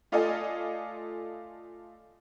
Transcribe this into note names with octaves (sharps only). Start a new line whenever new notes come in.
A3 F4 A4 D5 D#5 G#5